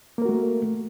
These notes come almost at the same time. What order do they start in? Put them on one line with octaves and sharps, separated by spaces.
A#3 A#4 F#4 A3